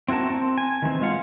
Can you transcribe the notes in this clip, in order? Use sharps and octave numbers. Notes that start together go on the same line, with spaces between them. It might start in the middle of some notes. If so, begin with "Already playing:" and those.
C4 E4 F#4 A#4 A5
C4
G#5
D#3 E3 G#3 C4
G#3 F4 F5 F#5